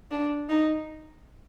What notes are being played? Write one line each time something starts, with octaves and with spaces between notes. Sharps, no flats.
D4
D#4